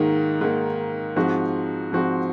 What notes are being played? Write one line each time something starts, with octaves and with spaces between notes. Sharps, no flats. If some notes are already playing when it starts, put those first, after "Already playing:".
Already playing: G#2 D#3 A#3
G#2 D#3 A#3
G#2 F3 C4 F#4
G#2 F3 C4 F#4